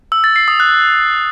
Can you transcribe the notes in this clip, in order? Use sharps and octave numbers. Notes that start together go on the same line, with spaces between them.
E6
A6
C7
D#6
F#6